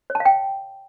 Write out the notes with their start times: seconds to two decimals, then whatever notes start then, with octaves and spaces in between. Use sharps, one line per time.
0.10 C#5
0.15 A5
0.20 F5
0.25 G5